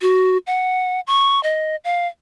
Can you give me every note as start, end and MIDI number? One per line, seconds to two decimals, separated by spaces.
0.02 0.38 66
0.47 1.00 78
1.07 1.42 85
1.43 1.76 75
1.84 2.07 77